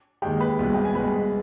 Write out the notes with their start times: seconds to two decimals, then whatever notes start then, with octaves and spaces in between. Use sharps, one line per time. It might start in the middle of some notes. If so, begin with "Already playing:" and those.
0.22 D#2 D#3 G#3 G4 G5
0.40 B4 B5
0.59 C2 B2 G#3
0.74 G5
0.85 G#5
0.95 C2 B2 G#3 B4 B5